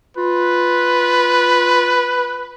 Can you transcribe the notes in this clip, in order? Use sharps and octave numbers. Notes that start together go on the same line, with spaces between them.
F4 B4